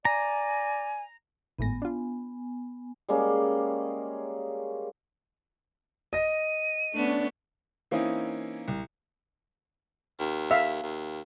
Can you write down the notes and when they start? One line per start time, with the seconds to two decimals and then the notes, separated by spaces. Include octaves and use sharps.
0.05 D5 G#5 A#5
1.59 G#1 A2 B3 G#5 A#6
1.82 D4 F4
3.09 G3 G#3 A#3 C#4
6.13 D#5 A#6 D#7
6.94 A3 B3 C#4 D4
7.91 E3 A#3 C4 C#4 D#4 E4
8.68 C2
10.19 D#2
10.51 E5 F5
10.83 D#2